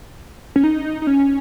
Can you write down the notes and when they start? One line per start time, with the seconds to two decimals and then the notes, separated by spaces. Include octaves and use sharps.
0.56 C#4
0.64 D#4
1.02 D#4
1.07 C#4